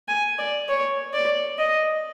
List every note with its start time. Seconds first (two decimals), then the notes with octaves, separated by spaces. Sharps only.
0.08 G#5
0.39 D5
0.69 C#5
1.14 D5
1.59 D#5